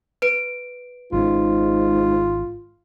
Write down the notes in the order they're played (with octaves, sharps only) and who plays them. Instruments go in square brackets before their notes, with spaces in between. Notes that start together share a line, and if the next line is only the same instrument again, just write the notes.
[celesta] B4 D7
[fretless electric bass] G#1 D#3 C#4 [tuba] G#2 [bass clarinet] F4